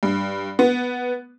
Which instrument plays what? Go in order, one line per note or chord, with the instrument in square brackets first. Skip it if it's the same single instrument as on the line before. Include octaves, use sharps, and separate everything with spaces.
[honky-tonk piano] G2
B3